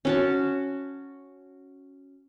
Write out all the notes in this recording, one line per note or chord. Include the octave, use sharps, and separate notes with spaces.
C#4 F#4 A5